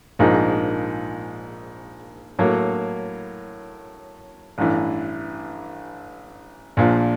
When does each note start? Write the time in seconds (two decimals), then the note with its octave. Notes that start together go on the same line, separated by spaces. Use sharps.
0.19 A#1 G#2 F3 A#3 D#4
2.39 A2 F#3 A#3
4.58 A1 G2 E3
6.77 A#1 A#2 F3